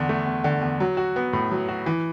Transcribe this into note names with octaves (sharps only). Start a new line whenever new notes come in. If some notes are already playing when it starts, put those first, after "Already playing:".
Already playing: E2 D3
A3
E2
D3
E2
F#3
F#4
B3
A2
F#3
F#4
E3